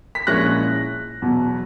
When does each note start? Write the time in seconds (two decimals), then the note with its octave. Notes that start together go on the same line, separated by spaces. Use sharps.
0.15 B6
0.27 A#1 A#2 G#3 C#4 E4 F#6 A#6
1.22 E2 B2 F#3